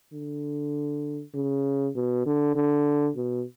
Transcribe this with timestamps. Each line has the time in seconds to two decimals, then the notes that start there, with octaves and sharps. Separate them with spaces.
0.13 D3
1.34 C#3
1.95 B2
2.26 D3
2.55 D3
3.16 B2